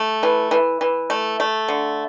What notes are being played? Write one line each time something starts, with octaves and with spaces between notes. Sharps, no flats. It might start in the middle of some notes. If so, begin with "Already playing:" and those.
Already playing: A3
E3
E3
E3
A3
A3
D3